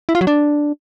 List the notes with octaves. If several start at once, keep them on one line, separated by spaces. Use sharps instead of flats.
E4
F4
F#3
D4